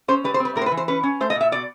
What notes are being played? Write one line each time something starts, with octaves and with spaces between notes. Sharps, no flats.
C#4 C5
G3 B4
C5
C4
B4
A2 A#4
C5
B4
E3
C5
C#4 B4
C#4
A3 C5
D#5
A#2
E5
B2 D5